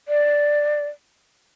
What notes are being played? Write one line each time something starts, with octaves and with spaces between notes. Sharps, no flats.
D5